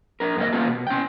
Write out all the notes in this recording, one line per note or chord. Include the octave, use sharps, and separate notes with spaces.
D4 A#4
F#2 A#3 F4 D#5
A#3 C#4 F4 G4 C#5 A5
B2
C#4 G5